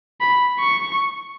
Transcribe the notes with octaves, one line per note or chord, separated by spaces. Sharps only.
B5
C#6